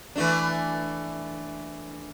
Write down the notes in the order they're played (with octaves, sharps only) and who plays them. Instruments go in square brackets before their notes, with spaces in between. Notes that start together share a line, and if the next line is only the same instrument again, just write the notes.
[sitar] E3 A3 D4